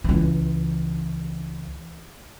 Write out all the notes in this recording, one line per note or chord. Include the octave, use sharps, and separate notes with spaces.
C#2 E3